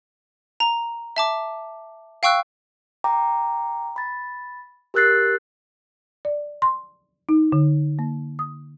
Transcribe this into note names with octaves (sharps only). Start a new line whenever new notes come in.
A#5
E5 A5 D6
F5 G5 C#6 E6 F#6
G5 A#5 D6
B5 A6
G4 A#4 E6 F#6 A6 C7
D5
C6
D#4
D3
A#3
D#6